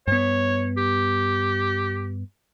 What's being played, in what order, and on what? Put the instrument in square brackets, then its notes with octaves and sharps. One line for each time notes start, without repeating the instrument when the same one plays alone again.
[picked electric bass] G2 B3 [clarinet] C#5
[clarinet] G4